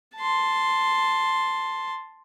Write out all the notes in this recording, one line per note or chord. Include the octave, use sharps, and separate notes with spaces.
A5 C6